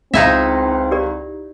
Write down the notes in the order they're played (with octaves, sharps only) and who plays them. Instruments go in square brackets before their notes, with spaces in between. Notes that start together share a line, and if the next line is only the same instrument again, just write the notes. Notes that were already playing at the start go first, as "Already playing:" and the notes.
[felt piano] C#2 F5 [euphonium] C4 [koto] D#4 E4 E5
[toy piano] G4 A#4 D5